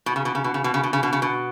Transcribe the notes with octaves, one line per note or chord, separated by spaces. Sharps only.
B2
C#3
B2
C#3
B2
C#3
B2
C#3
B2
C#3
B2
C#3
B2